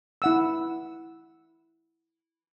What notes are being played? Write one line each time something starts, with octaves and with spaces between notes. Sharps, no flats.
E4 F#5 E6